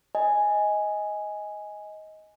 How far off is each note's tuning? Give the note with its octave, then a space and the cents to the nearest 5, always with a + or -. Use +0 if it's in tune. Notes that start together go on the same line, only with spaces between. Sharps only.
D#5 +15 G#5 +0